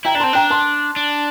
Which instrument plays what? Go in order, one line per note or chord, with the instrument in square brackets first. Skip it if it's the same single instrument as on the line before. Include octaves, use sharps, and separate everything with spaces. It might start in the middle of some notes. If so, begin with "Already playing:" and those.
[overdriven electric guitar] E4 [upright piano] G5 A#5
[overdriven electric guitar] D4 [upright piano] A#5
[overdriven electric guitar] C4 [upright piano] A5 C6
[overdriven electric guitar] D4 [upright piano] G5 A#5
[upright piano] A5 C6
[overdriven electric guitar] D4